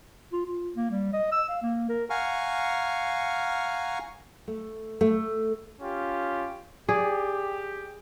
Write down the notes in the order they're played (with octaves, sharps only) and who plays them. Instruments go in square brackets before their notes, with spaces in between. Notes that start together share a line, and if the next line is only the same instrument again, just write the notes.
[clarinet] F4
F4
A#3
G3
D#5
E6
F5
A#3
A#4
[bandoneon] F5 F#5 G#5 A#5 C#6 F6
[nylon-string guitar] A3
A3
[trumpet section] C#4 F4 G4
[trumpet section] G4 [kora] G#4 D5